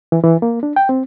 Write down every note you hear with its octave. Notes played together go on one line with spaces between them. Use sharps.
E3
E3
A#3
D4
G5
C4